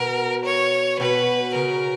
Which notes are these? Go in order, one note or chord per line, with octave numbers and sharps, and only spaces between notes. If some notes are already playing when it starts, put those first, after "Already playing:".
Already playing: B2 A#4
C#5
B2 B4
C#3 A#4